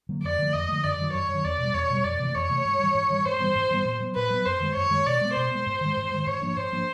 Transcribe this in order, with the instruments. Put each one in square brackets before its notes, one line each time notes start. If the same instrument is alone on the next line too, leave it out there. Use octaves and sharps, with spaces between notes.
[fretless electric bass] D3 F#3 A#3
[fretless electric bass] F2 [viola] D5
[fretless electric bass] D3 F3 A3
[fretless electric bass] F2 [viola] D#5
[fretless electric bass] D3 F3 A3
[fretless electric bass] F#2 [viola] D5
[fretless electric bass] D#3 F#3
[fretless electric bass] F#2 [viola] C#5
[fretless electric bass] D#3 F#3
[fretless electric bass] E2 [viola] D5
[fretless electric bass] B2 G3
[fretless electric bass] E2 [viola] C#5
[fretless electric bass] B2 G3
[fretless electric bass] F2 [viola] D5
[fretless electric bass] C3 E3 A3
[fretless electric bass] F2 [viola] C#5
[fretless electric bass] C3 E3 A3
G#2
E3 G3
G#2
E3 G3
[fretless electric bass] G#2 [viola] C5
[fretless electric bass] E3 G3 B3
G#2
E3 G3 B3
A#2
F#3 B3
[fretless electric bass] A#2 [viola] B4
[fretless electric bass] F#3 B3
[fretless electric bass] F#2 [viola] C5
[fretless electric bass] D#3 G#3
[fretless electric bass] F#2 [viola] C#5
[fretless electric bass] D#3 G#3
[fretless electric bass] B2 [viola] D5
[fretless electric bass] G#3 B3
[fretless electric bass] B2 [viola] C5
[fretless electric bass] G#3 B3
G#2
D#3 G#3
G#2
D#3 G#3
[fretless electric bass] G#2 [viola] C#5
[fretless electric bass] F3 A#3 D4
[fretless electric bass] G#2 [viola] C5
[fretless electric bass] F3 A#3 D4